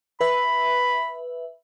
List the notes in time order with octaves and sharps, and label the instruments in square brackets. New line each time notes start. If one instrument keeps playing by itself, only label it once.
[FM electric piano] B4 E5 [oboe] B5